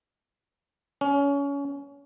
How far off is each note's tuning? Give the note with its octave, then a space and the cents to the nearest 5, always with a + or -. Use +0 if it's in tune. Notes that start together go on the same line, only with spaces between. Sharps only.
C#4 +25